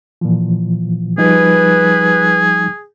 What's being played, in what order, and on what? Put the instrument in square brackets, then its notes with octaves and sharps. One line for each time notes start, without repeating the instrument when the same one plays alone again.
[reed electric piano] A#2 E3 F3
[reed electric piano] F3 G3 D#4 [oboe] G#4 [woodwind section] B4